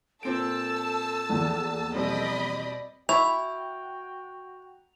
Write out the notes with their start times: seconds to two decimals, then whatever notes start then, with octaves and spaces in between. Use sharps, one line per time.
0.23 A#2 C4 A4 A5 E6 D7
1.29 A#1 E2 E3
1.95 B2 G3 C4 D5 D#5 B5
3.09 E4 F#4 G5 B5 C#6 F7